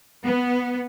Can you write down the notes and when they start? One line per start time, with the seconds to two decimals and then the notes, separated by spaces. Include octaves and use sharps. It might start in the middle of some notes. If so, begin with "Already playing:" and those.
0.24 B3